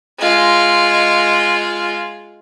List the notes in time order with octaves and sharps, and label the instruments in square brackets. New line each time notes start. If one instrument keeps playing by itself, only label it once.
[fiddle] G#3 F4